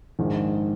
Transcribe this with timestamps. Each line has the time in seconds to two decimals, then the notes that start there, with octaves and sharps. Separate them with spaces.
0.19 A#1 G#2 D#3 G#3